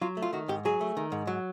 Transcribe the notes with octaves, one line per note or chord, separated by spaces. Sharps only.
F#3 F4
A3
F4
D#3 F#4
G#2 G4
F#3 G#4
A3
D#3
G#2
F#3